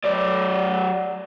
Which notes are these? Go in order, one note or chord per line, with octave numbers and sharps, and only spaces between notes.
F#3 D5